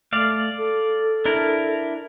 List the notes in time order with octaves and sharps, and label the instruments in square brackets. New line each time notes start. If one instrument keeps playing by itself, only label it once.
[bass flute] A3 [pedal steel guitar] D5 F5
[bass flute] A4
[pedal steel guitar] D4 E4 A#4